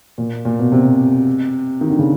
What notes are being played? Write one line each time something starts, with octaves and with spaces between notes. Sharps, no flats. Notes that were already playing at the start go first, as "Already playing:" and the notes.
A#2
A#2
B2
C3
D#3
D3
C#3